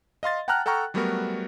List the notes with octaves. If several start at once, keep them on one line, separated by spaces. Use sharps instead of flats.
D#5 F5 C6 A6
F#5 G5 A5 A#5 F6 F#6
A4 F#5 G5 A#5 C#6 F6
F#3 G3 A3 B3 F#4 A#4